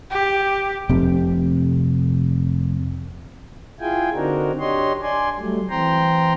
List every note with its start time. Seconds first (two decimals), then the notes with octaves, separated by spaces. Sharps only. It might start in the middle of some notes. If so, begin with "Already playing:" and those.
0.10 G4
0.89 F1 C3
3.80 E4 F4 G#4 G5 G#5
4.14 D3 C4 D4 D#4 F#4 A#4
4.59 D4 G4 C#5 D#5 C6
5.02 D5 G#5 C6
5.38 F#3 G3 A3
5.69 E3 C4 G5 A#5 C6